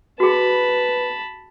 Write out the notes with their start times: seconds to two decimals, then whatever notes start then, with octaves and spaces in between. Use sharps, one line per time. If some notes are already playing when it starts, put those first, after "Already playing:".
0.20 F#4 G#4 B4 A5 B5